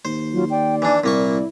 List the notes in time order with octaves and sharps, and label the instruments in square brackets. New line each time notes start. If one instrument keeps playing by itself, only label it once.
[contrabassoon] D#2 [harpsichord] C5
[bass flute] F#3 [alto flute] F4
[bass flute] D5 [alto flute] G5
[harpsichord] E3 D4 [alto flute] G#5
[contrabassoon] C2 [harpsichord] A#2 A#3 C#6 [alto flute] E4